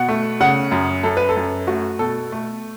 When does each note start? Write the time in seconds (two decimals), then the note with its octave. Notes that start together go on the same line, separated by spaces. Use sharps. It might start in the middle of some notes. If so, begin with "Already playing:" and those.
Already playing: B2 F#5
0.09 A3
0.40 C#3 F#5
0.71 F#2
1.03 F#2 A4
1.17 B4
1.29 A4
1.37 F#2
1.67 A3 F#4
1.99 B2 A4
2.32 A3